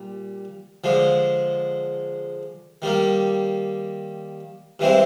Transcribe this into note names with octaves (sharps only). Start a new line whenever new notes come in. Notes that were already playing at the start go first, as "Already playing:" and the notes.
Already playing: A#2 G3
D3 F3 G#3
D#3 G3 A#3
G2 E3 G#3 C4 E4